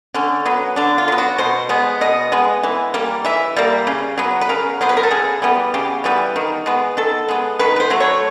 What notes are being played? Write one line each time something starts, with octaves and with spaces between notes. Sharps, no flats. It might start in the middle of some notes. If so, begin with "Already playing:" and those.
D3 C#4
F#3 B3
D3 D4
F4
F#3 B3
F#4
B2 C5
G#3 B3
B2 D#5
G#3 B3
E3
G3 A#3
E3 E5
G3 A#3
C#3
F#3 B3
B4
C#3 A#4
F#3 B3 C5
B4
A#4
A4
C#3 G#4
E3 G3 B3
C#3 G4
E3 G3 B3
D#3
G#3 B3
D#3 A4
G#3 B3
D#3 B4
B4
C5
F#3 A3
C#5